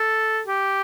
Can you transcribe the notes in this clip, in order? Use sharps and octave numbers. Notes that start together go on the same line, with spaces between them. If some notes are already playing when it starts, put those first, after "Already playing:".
Already playing: A4
G4